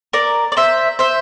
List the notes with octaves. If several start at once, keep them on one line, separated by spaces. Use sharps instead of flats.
A#4 D5
D5
C5 E5
C5 E5